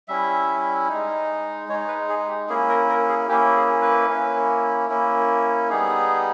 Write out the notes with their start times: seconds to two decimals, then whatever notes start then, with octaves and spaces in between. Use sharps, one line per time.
0.08 G3 C#4 E4 E5
0.89 G#3 D#4
1.68 G#3 C#5
1.73 D#4
1.88 B4
2.09 G#4
2.28 G4
2.49 A#3 C#4 E4 G#4
2.69 A#4
2.89 A#4
3.09 G#4
3.29 A#3 C#4 E4 G4
3.56 G#4
3.82 B4
4.09 A#3 C#4 E4
4.89 A#3 C#4 E4
5.70 G3 B3 D#4 G#4